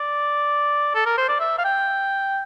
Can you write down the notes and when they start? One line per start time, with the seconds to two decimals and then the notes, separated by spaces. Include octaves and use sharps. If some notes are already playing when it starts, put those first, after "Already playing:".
Already playing: D5
0.95 A4
1.06 A#4
1.17 C5
1.29 D5
1.40 E5
1.58 F5
1.65 G5